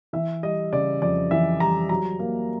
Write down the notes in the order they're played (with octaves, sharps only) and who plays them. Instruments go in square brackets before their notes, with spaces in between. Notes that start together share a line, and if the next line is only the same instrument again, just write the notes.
[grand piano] E3 E5
G3 D#5
C#3 D5
F2 D5
E3 E5
G3 A#5
F#3 A#5
A#3